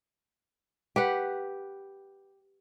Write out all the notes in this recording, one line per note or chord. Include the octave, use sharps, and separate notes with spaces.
G4 B4 F#5